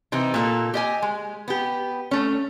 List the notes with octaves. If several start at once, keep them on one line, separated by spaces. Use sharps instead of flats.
C3 E3 D#4
A#2 A#3 A4
G4 D#5 G#5
G#3
B3 G4
A3 C#4